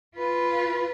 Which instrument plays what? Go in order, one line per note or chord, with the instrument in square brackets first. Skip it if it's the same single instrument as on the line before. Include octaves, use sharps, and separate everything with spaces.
[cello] F4 B4